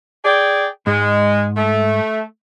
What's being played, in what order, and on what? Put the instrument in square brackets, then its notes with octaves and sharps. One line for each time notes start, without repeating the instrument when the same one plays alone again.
[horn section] G#4 D5 G5
[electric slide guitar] G#2 [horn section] G#3
[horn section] A3